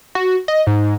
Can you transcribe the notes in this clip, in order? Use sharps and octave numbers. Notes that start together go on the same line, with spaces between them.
F#4
D#5
G#2